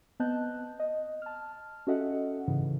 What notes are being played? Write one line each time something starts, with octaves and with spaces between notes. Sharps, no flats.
B3 C4 D#5 A5 F#6 G6
D#5
A5 F6
C#4 F#4 A4 D#5 E5 F#5
G#2 C#3 E3